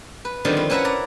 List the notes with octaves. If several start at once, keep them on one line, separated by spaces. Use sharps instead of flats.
B4
D3 D#3 F3 G3 B3 C4
F4
C#4 E4 B4 E5 F#5 A#5
D5 A#5